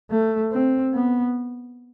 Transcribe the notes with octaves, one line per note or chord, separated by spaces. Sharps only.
A3
C4
B3